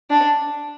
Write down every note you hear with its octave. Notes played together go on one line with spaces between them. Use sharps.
D4